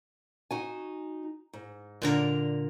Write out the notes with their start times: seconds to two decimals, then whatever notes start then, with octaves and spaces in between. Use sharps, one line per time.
0.51 D#4 F#4 G#5
1.53 G#2
2.02 A#2 D3 A#4